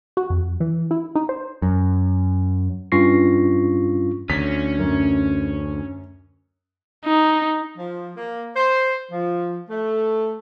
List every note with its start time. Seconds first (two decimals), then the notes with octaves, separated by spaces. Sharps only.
0.17 F#4
0.30 F2
0.60 E3
0.91 E4
1.15 D#4
1.29 C5
1.62 F#2
2.92 G2 C#4 F4 C#6 A#6 C7
4.30 D2 C#4 B6
4.79 F#2
7.05 D#4
7.77 F3
8.17 A#3
8.56 C5
9.11 F3
9.70 A3